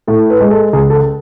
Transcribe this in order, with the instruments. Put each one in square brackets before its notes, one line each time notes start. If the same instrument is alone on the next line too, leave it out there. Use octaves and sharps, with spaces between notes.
[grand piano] A2 A4
B4
G#3
A4
C#2 G#4
A4